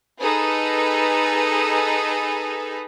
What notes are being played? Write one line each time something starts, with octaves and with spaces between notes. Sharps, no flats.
D#4 G#4 A4 B4